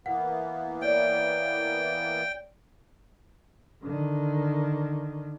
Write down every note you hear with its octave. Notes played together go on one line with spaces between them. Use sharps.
E3 A#3 B3 F#5
C#5 D5 G5
D3 D#3